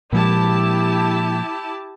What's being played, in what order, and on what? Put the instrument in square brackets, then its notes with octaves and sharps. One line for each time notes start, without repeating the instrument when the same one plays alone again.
[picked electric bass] A#2 F3 G#3 [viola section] E4 G4 A5